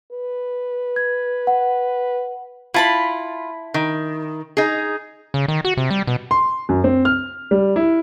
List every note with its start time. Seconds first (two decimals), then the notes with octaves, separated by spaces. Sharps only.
0.12 B4
0.96 G#6
1.47 F#5
2.74 E4 F4 A5 B5
3.74 D#3
4.57 D#4 G#4
5.34 C#3
5.48 D#3
5.65 F#4
5.77 C3
5.91 G3
6.07 B2
6.31 C6
6.69 F#2
6.84 C4
7.05 F6
7.51 G3
7.76 E4